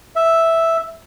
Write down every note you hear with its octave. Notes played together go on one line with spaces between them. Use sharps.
E5